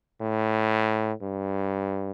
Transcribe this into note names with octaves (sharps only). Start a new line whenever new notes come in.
A2
G2